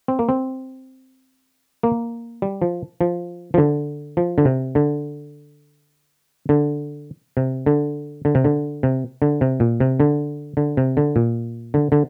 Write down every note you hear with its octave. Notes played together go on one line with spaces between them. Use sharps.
C4
A#3
C4
A#3
G3
F3
F3
F3
D3
F3
D3
C3
D3
D3
C3
D3
D3
C3
D3
C3
D3
C3
A#2
C3
D3
D3
C3
D3
A#2
D3
D3